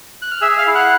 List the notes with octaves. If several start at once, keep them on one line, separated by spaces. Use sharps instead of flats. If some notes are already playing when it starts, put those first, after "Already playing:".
F#6
F6
G#4 E5 E6
F5 F6
E4
F#5 F#6